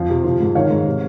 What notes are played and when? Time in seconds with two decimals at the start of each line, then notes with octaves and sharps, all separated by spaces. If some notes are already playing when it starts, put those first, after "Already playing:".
Already playing: F2 F3 F5
0.09 C3
0.24 F3
0.40 G#2
0.55 D#3 C#5 F5
0.70 G#2
0.86 C3